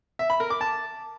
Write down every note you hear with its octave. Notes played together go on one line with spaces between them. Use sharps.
E5
B5
A#4
D6
A5